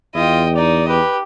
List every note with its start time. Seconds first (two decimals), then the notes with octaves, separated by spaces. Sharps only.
0.15 E2 F4 D#5 G5
0.56 D#4 D5 D#5
0.88 G4 B4